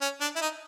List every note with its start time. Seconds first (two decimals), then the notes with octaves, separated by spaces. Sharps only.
0.01 C#4
0.21 D4
0.36 E4
0.42 D#4